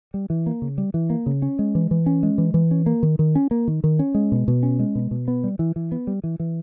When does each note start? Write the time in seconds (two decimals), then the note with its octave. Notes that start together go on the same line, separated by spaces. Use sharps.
0.14 G3
0.30 E3
0.46 A#3
0.62 C#3
0.78 G3
0.94 E3
1.10 A#3
1.26 C#3
1.42 C#4
1.59 G#3
1.75 E3
1.91 E3
2.06 C#4
2.23 G#3
2.38 E3
2.54 E3
2.71 C#4
2.86 A#3
3.03 D#3
3.19 D#3
3.35 C#4
3.51 A#3
3.68 D#3
3.84 D#3
3.99 C#4
4.15 G#3
4.32 B2
4.48 B2
4.63 C#4
4.79 G#3
4.95 B2
5.11 B2
5.28 B3
5.44 G3
5.59 E3
5.76 E3
5.92 B3
6.07 G3
6.24 E3
6.40 E3